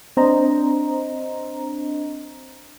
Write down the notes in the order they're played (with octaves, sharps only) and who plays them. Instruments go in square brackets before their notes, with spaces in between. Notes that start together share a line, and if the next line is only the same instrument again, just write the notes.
[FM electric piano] C4 D4 C5 D#5 A#5